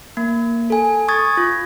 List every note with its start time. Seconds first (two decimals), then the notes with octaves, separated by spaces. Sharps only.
0.17 A#3
0.70 A4 G#5
1.08 C#6 D#6 G#6 A6
1.37 F4